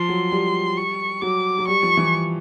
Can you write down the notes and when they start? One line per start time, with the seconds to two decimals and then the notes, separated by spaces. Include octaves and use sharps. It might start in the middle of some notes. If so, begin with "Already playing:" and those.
Already playing: F3 C6
0.09 F#3
0.31 G3
0.77 C#6
1.22 F#3 D6
1.59 F#3
1.68 G3 C#6
1.83 F3
1.97 E3